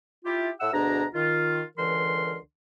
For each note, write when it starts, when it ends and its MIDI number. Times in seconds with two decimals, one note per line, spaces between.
0.25 0.50 64
0.25 0.50 65
0.25 0.50 67
0.60 0.70 45
0.60 0.70 76
0.60 0.70 78
0.60 0.70 88
0.73 1.04 38
0.73 1.04 47
0.73 1.04 62
0.73 1.04 68
0.73 1.04 82
1.14 1.61 51
1.14 1.61 65
1.77 2.36 37
1.77 2.36 50
1.77 2.36 52
1.77 2.36 70
1.77 2.36 84